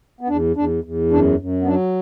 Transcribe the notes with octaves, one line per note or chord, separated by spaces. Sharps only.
B3
E2 D4
E2 D4
E2
F#2 D4
F#2
B3
F#3 D4